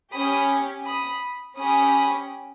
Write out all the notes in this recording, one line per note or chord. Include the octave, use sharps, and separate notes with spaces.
C#4 G4 B5 D#6
B5 D#6
C#4 G4 B5 D#6